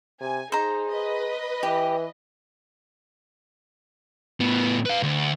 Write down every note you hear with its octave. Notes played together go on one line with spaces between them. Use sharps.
C3 G#5
D#4 G#4 C5 A#5
B4 D#5
E3 G4
A2 B3
B4 F5
D2